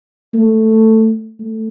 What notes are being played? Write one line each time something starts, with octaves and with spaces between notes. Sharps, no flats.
A3
A3